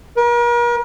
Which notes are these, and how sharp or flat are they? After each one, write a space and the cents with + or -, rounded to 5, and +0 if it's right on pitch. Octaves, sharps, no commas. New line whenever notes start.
A#4 +40